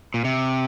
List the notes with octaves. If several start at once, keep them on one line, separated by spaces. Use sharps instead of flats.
A#2
C3